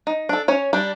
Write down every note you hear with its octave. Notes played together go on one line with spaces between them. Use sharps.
D#4
D4 A4
C#4 C#5
G3 D4